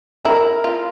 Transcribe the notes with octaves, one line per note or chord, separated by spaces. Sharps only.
E4 A#4 A#5
F4